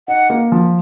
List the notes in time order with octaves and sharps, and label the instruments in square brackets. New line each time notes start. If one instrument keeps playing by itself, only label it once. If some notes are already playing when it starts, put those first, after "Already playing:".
[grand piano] D#4 [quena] F#5
[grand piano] A#3
F3